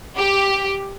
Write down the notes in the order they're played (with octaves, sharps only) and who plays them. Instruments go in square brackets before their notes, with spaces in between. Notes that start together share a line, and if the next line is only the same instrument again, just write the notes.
[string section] G4